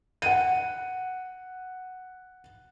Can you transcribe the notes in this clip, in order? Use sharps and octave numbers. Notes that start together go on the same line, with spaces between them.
F#5 D#7